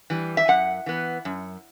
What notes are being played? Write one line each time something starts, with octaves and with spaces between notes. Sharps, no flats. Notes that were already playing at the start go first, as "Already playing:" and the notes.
E3 G3
E5
F#2 F#5
E3 B3
F#2